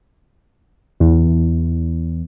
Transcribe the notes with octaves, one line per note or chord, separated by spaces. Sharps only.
E2